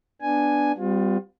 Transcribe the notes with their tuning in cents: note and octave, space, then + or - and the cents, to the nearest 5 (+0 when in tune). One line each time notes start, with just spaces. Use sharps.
B3 +0 D4 +0 G#5 +0
G3 +0 C4 -45 F4 +30